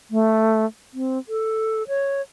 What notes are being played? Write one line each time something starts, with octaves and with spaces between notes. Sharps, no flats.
A3
C4
A4
C#5